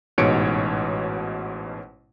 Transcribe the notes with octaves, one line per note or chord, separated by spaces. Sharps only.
A1 G#2 B2 C#5 C#7 D7